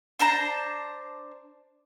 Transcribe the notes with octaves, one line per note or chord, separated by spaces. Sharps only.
D4 C5 A5 A#5